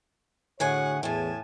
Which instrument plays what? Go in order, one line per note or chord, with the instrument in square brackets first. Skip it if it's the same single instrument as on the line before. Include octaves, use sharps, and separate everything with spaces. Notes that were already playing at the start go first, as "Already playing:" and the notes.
[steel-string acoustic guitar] A2 G#4 G#5 [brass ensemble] D3 F#4 C#5 [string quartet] F#5
[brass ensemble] E2 [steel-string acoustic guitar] A2 C#3 [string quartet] G#5 A5